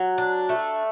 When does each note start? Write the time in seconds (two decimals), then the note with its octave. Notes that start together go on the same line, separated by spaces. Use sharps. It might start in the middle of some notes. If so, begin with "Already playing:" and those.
Already playing: F#3
0.18 D4
0.49 A3